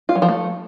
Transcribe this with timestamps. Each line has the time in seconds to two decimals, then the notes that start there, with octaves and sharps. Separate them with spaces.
0.09 F4
0.15 F#3
0.22 F3
0.29 A3